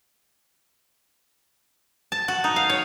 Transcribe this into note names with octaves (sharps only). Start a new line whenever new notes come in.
A5
F#4
D#4
F5
C#5